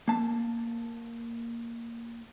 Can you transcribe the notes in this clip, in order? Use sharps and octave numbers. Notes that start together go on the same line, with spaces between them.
A#3 A5